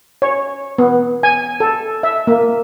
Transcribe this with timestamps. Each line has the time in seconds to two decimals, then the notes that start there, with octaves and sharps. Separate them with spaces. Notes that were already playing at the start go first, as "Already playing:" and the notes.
0.22 C#5
0.78 B3
1.23 G#5
1.60 A4
2.03 E5
2.27 A#3